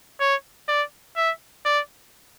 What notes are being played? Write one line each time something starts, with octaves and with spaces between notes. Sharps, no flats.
C#5
D5
E5
D5